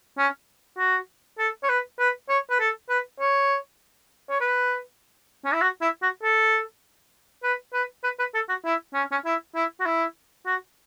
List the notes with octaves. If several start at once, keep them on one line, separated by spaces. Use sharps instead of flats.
C#4
F#4
A4
C#5
B4
B4
C#5
B4
A4
B4
C#5
C#5
B4
C#4
E4
F#4
E4
F#4
A4
B4
B4
B4
B4
A4
F#4
E4
C#4
C#4
E4
E4
F#4
E4
F#4